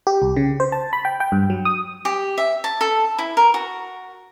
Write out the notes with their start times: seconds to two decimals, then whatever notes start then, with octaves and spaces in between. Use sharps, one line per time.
0.07 G4
0.22 C2
0.37 C#3
0.60 C5
0.72 A5
0.93 B5
1.05 G5
1.20 G5
1.32 G2
1.50 F#3
1.65 D#6
2.05 G4
2.38 E5
2.64 A5
2.81 A4
3.18 E4
3.37 A#4
3.54 F#4